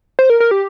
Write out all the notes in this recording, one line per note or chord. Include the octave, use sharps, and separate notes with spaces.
C5
A#4
A#4
G4